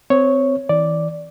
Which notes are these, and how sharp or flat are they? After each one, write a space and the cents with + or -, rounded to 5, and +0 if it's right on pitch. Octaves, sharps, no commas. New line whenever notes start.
C4 -20 C#5 +0
E3 -35 D5 +0